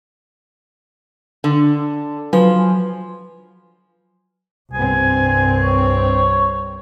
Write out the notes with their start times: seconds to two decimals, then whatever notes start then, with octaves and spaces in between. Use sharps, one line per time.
1.44 D3
2.33 F3 F#3 B4 G#5
4.73 C2 G2 C4 G#5
5.62 C#5